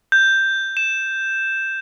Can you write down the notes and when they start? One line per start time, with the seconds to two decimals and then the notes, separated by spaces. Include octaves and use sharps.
0.12 G6
0.77 E7